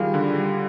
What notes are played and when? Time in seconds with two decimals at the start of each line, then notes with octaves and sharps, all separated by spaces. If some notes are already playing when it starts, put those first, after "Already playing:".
Already playing: D#3 G3 F4 G#4
0.14 D3
0.35 G3